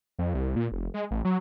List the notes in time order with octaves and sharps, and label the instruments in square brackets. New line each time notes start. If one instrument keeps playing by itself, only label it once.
[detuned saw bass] F2
C2
A#2
F1
G#3
A1
F#3